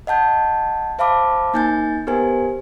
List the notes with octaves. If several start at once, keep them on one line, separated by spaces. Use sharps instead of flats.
D#5 F#5 A5 G6
C5 E5 F5 A5 B5 D6
A#3 D#4 G#5 G6 A6
B3 G4 A#4 C5 G#5